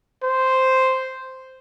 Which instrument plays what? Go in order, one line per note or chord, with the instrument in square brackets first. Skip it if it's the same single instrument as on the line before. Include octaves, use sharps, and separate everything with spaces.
[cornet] C5